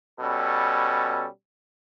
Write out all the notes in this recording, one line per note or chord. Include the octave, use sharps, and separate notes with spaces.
B2 G3 C#4 A4